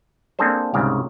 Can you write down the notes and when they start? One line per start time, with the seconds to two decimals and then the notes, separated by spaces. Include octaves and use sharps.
0.39 A#3 C4 D4 G#4 A4 C5
0.74 C2 G#2 C#3 G4 F5